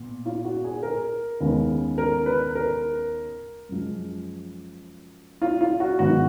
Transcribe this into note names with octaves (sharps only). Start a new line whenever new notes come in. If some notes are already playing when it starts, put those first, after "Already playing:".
Already playing: A#2 B3
F4
F#4
G#4
A#4
D#2 C#3 G#3 B3
A#4
B4
A#4
F#2 F3 G#3
F4
F4
F#4
G#2 D#3 F#3 B3 F#4